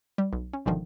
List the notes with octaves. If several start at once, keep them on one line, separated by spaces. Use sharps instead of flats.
G3
B1
C#4
G1 G#2 B2 D3 D#3 F3